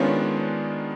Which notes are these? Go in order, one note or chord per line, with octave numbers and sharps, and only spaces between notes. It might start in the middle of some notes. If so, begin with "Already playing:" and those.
Already playing: D#3 G#3 B3 C#4 D4 F4